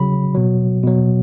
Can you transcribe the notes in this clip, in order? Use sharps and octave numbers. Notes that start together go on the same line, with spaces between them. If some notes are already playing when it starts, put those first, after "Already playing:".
Already playing: C#3 F#3 B5
B2 F#3
B2 F#3